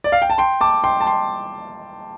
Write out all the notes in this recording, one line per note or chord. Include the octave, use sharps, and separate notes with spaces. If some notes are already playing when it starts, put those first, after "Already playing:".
D5
F5
G5
A5
G5 C6
A5 D6
G5 C6
A5
G5 C6